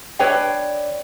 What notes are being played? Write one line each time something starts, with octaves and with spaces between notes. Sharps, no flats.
D4 B4 C#5 G5